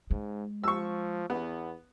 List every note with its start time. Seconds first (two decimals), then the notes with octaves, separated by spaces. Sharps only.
0.11 G#2 G#3
0.64 F3 C#6 E6
1.30 E2 B3